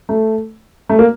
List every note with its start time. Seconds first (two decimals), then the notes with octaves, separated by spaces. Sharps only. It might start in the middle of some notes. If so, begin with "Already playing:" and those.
0.09 A3
0.89 A3
0.99 A#3